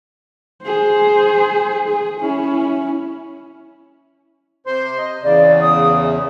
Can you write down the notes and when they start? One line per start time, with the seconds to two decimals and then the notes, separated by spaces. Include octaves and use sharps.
0.63 G#4 C5
1.88 G#4
2.20 C#4 E4
4.66 C3 C5 C6
4.98 D#5
5.23 E2 C#3 D5
5.60 D#6
6.04 E5